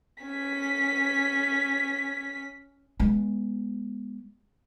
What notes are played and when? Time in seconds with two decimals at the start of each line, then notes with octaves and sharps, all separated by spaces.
0.24 C#4 B6
3.00 G#3 B3